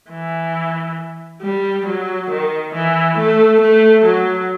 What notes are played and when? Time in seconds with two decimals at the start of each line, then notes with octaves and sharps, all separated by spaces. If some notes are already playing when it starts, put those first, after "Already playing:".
0.11 E3
1.42 G3
1.86 F#3
2.30 D#3
2.74 E3
3.18 A3
3.61 A3
4.05 F#3